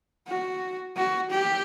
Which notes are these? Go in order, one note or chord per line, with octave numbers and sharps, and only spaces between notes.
F#4
F#4
G4